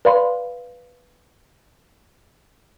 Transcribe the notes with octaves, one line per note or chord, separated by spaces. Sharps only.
B4 D5 F5 B5 C6